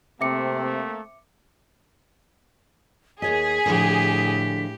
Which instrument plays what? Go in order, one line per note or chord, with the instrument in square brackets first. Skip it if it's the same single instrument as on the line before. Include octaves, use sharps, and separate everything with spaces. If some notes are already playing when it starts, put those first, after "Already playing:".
[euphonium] C3 [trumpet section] A3 A#3 [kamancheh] C4 [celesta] E5 D6 C#7
[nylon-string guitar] D#2 C#5 D#5 [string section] G#4 [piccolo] B6
[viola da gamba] A2 G4 [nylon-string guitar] D3 F3